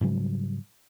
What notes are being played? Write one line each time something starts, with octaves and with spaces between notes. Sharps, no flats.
G#2 C#3 F#3 G3